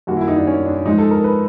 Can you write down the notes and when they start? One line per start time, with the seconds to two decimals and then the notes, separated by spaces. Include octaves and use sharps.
0.07 F#2 D#3 G3 A#3 F#4
0.17 E4
0.28 D#4
0.36 D4
0.47 C#4
0.66 D4
0.85 G#2 F3 G#3 D#4
0.98 A4
1.11 A#4
1.24 B4